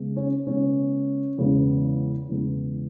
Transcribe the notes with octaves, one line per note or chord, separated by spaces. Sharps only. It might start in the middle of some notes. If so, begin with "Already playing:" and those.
Already playing: C#3 G#3 B3
C#4
C#3 G#3 B3 C#4
E2 C#3 G#3 B3
E2 C#3 G#3 B3